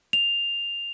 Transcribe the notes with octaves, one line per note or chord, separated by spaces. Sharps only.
F7